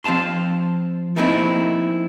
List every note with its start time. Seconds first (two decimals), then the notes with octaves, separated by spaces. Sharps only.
0.04 F3 C4 F5 A5 C6
1.16 F3 A3 A#3 C4 D#4 E4